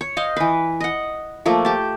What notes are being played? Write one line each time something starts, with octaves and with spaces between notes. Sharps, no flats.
C#5
C5 D#5 F5
E3 B4
D#5 F#5
F3 A3 A#3
G4 A5